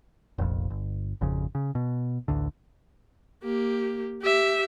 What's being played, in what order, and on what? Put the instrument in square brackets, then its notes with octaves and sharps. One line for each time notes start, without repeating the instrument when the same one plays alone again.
[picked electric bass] F1 A#1 F2
G1
G#1 F2 C#3
C#3
B2
A1 D2 D3
[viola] A#3 G4
G4 E5